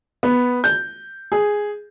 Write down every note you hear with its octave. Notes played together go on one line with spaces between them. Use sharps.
B3
G6
G#4